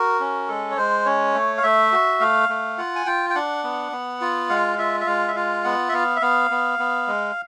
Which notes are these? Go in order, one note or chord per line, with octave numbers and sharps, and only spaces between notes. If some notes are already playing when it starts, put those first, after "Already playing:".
Already playing: F#4 A#4
C#4
G#3 A4
C#5
G#3 C5
C#4 C#5
A3
F5
A3 E5
F#4
A3 F5
A3
F4 F#5
G#5
F4 G5
G5
D4 F#5
B3
B3
F4
G#3 F5
F4 E5
E5
G#3 F5
E5
F4 F5
B3 F#5
E5
B3 F5
E5
B3 F5
B3
B3
G#3